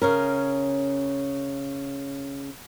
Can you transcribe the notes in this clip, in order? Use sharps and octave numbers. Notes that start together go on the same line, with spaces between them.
C#3 C#4 A#4